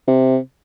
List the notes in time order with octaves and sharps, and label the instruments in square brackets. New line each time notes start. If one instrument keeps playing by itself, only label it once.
[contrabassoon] C3